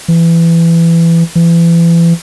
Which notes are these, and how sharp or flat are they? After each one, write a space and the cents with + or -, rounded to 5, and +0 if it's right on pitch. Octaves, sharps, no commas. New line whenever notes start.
E3 +20
E3 +35